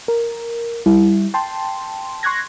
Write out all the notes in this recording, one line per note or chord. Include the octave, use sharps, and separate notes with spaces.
A#4
G3 E4
G5 A5 C6
C6 C#6 F#6 G#6 A#6